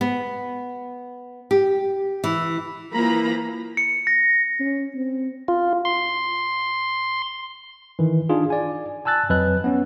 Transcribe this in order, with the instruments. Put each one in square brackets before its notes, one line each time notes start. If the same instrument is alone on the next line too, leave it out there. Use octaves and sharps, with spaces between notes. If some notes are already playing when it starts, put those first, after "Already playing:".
[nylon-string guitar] B3
G4
E3
[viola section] E3 F3 A#3 A#5 B5
[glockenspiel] C#7
A#6
[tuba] C#4
C4
[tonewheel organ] F4
C6
[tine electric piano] D#3 E3
D4 D#4 F4 G#4
D5 G#5
G#5 A5 E6 F#6 A6
F2 F#3 B4 D#5 F#6
B3 C#4